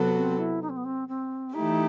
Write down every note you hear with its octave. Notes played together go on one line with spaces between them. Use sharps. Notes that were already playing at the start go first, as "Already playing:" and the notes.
Already playing: C3 F#3 B3 F#4 A4
C4
E4
D#4
C4
B3
C4
C4
E3 A3 D#4 E4 G4